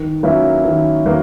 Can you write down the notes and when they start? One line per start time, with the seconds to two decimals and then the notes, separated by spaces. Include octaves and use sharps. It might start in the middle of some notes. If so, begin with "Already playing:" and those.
Already playing: D#3
0.23 F#3 A#3 C#4 E4
0.64 D#3
1.06 F#3 A#3